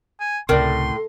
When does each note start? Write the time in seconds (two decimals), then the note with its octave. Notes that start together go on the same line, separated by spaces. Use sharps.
0.20 G#5
0.49 C#2 A2 C3 A#4 D5 C6